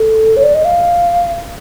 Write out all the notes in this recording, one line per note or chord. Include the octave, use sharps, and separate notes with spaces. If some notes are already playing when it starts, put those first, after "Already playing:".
Already playing: A4
C#5
D5
D#5
F5